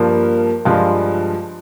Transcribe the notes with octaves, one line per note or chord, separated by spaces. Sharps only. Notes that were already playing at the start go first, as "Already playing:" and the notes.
Already playing: G2 F3 A#3
G2 F3 G#3 F4